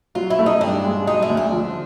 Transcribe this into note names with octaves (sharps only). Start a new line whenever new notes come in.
F#3 F4
E4
A3
D#4
G2 D4
G#3
F#3 D#4
E4
D2
D4
F3